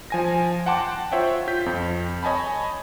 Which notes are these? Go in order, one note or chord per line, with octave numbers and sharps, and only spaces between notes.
F3 G#5 A#6
F#5 G5 A5 C6 D6
F4 C5 C#5 E5 F#5 G5
F4 G6 B6
F2
C#5 D#5 G#5 A5 B5